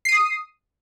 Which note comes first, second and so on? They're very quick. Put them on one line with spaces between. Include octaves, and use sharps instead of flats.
C7 D#7 D#6